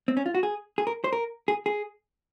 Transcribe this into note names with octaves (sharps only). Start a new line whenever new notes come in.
C4
C#4
F4
F#4
G#4
G#4
A#4
C5
A#4
G#4
G#4